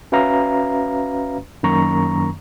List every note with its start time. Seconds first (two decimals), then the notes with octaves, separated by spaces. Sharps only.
0.12 C#4 F#4 B4 E5 F5 A#5
1.63 F#2 D#3 A#3 A#5 C#6